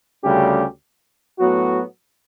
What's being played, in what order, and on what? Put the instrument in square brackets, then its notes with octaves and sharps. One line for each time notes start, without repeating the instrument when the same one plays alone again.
[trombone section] D2 C#3 G3 C#4 G4
A2 F#3 B3 F#4